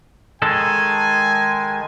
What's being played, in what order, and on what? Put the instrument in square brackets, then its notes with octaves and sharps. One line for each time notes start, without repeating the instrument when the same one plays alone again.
[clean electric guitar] D#3 G#3 A4 [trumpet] G#5